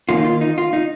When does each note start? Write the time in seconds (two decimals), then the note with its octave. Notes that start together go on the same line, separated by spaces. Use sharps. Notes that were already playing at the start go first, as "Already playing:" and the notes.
0.09 D#2 D#3 A#3 C#4 F4
0.17 D#4
0.24 F4
0.41 D#4
0.58 F4
0.73 D#4